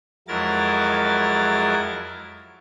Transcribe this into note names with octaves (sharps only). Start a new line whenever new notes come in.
F2 F#3 G#3 E4 A#4 A6